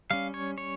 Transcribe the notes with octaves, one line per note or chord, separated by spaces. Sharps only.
G3 C#4 F5
C#5
C#5